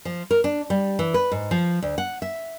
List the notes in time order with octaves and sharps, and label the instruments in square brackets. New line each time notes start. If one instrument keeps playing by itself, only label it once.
[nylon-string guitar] F3
A#4
D4
G3
E3
B4
G#2
F3
D2
F#5
E5